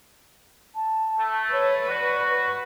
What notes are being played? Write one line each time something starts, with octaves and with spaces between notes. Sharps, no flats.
A5
A3
B4 C#5
F#4 D5
B4 C#6